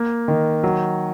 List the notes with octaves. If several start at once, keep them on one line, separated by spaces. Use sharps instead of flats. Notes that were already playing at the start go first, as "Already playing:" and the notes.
Already playing: A#3
D#3
F#3